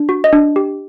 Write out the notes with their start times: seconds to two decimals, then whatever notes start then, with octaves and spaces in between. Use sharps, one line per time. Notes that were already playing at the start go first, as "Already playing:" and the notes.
Already playing: D4
0.09 F#4
0.24 D#5
0.33 D4
0.56 G4